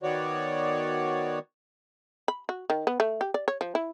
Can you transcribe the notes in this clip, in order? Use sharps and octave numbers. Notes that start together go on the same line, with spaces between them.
D#3 B3 F#4 C#5 D5
B5
F#4
D#3
B3
A3
G4
D5
C#5
F3
E4